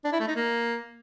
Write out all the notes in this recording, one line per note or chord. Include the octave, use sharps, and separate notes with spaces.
D4
E4
A3
D#4
A#3